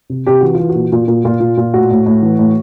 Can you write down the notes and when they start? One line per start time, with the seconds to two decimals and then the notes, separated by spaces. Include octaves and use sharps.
0.10 C3
0.27 C3 G4
0.41 E3 F#4
0.54 F4
0.60 E3
0.69 F#4
0.75 A#2
0.92 A#2
1.08 A#2
1.25 A#2 F4
1.40 A#2
1.57 A#2
1.74 A2 F#4
1.91 A2
2.06 A2
2.22 E3
2.39 A2